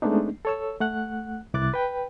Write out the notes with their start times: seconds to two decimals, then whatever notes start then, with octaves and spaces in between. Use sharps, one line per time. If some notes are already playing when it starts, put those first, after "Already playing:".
0.02 G#3 A3 B3 C4 D4 D#4
0.45 A4 C#5 E6
0.81 A3 F#5 F#6
1.54 C2 E4 D6 F#6 A6
1.74 B4 G5